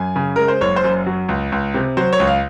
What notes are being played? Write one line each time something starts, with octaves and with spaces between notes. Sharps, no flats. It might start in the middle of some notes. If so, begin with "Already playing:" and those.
Already playing: F#2 G#5
C#3
G#3 A#4
C5
F#1 C#5
C5
F#2
F#3
C#2
C#2
C3
F#3 C5
C#5
C#2
F5